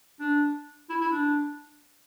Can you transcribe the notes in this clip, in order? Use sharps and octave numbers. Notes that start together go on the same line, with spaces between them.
D4
E4
E4
D4